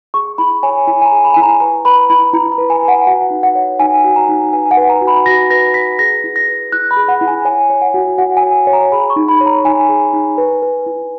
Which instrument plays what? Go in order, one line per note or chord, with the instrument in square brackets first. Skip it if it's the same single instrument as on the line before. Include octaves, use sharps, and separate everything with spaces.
[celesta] G#4 C#6
E4 B5
C#5 G#5
E4 G#5
G#5
A#5
G#4
B5
E4 G#5
A#5
B4 A#5
B4 B5
E4 B5
E4 A#5
A#5
B4
G#5
B4
F#5
F#4 F#5
D#4
F#5
C#5
D#4 G#5
F#4
A#5
D#4
B4 G#5
G#5
F#5
B4
A#5
F#4
B5
F#4 A#6
B4 A#6
B4 B6
G#4 A#6
E4
A#6
B4
E4 F#6
B5
G#4
F#5
E4
G#5
C#5 G#5
C#5
F#5
F#4
F#4 F#5
G#5
C#5
C#5
A#5
G#4 B5
C#6
D#4
B5
C#5
A#5
D#4 G#5
G#4
D#4
B4
B4
E4